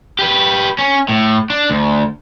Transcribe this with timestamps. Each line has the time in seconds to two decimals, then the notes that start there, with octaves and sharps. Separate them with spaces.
0.19 G4 B4
0.79 C#4
1.09 A2
1.50 D4
1.70 D2